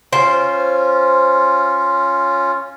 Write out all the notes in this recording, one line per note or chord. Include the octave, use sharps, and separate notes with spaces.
C#4 F4 C5